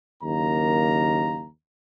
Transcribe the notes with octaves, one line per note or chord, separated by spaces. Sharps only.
F#1 D#2 A#3 A#5